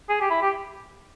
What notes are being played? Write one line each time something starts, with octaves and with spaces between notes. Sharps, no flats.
G#4
G4
E4
G4